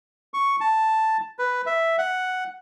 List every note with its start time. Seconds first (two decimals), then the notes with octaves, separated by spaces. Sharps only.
0.34 C#6
0.61 A5
1.39 B4
1.66 E5
1.98 F#5